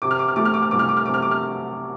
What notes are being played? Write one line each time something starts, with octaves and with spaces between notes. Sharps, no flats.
C3 D6
F6
D6
F6
A3 D6
F6
D6
F6
C2 D6
F6
D6
F6
C3 D6
F6
D6
F6